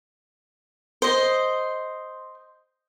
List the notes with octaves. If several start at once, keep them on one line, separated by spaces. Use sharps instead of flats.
C5 D#5